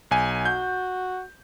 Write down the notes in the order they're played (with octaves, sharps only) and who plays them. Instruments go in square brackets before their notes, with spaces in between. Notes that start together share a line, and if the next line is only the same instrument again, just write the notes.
[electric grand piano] B1 G#5
[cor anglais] F#4 [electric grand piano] G6